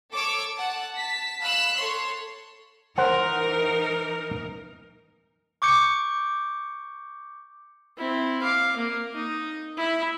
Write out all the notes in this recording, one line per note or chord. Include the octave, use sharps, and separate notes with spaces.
A4 C#5 D6 E6
F#5 A5
A5 B6
F5 B5 E6 F#6
A4 C#5 C6
E3 D#4 A#4 C5 F#5
C#6 D6 G6 C#7
C4 E4
F5 D6
A#3
D#4
E4 E5